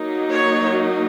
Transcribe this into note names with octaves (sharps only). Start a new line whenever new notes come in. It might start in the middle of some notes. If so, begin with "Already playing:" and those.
Already playing: F#3 A#3 D#4
C#5